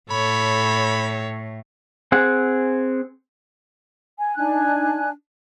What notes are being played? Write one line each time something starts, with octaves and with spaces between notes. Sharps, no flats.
A2 A4 C#5 B5
C4 G#4 F#5
G#5
D4 D#4 G#5 F#6